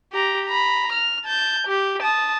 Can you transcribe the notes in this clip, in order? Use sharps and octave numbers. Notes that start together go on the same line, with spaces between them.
G4 A#5
A#5 B5
F6
A5 G6
G4
A5 D#6